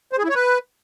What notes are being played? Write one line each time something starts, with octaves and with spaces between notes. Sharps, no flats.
C5
G#4
E4
C#5
B4